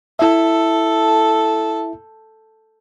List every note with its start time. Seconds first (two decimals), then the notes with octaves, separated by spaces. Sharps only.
0.19 E4 A4 E5